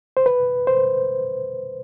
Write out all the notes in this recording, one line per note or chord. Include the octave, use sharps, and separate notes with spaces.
C5
B4
C5